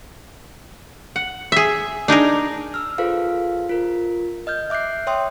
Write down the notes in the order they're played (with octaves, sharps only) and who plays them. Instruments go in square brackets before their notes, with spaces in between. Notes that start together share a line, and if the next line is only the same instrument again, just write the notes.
[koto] F#5
G#4 E5
D4 D#4 G#4 A#4
[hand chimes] E6 F6
F4 G#4 A4 B4 C5 F5
F4 A#4
D#5 F6 G6
E5 D6 F#6 G6 C7
C#5 E5 G5 C6 D#6